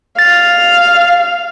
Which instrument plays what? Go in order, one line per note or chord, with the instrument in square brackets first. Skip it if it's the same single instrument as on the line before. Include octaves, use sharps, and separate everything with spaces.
[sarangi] F5 [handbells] A6